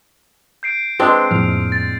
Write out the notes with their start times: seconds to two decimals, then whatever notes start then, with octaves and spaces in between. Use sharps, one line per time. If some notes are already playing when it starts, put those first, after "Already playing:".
0.63 G6 C7 D7
0.99 G#3 C4 D4 B4 D#5
1.31 F2 A2 F3 A#3 F6
1.72 A6